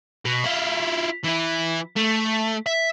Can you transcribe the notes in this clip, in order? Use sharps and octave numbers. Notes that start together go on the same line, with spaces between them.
B2
E4 F4
E3 E4
A3
E5